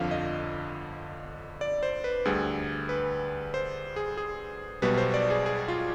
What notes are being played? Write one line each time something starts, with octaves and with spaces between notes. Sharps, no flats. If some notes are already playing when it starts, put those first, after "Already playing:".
Already playing: G1 F2 D3 F3 F5
D#5
D5
C5
B4
D2 D3 G3 G#4
B4
C5
G#4
G#4
B1 B2 G3 B4
C5
D5
G#4
G#4
F4